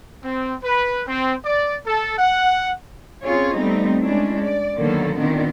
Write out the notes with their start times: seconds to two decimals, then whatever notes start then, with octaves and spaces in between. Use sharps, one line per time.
0.24 C4
0.64 B4
1.06 C4
1.45 D5
1.86 A4
2.18 F#5
3.24 C4 C#4 F4 G#4 C#5
3.55 G3 A3 B3 C4 D#4
4.01 G#3 C#4 D4 E4
4.43 D5
4.77 B2 D3 D#3 F#3 A#3 A4
5.17 A#2 D#3 B3 C4 D4